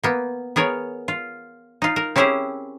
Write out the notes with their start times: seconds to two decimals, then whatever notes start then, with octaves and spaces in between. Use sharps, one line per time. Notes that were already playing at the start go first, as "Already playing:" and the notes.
0.03 A#3 B3
0.56 B3 G#4 A#4 C#5
1.08 F4
1.82 D#4 F4
1.96 A#4
2.16 C4 C#4 E4 G4 G#4 C5